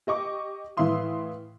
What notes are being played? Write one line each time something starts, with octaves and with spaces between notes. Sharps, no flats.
G4 D#5 C#6 D6
A2 E3 E5 F5 C6 D#6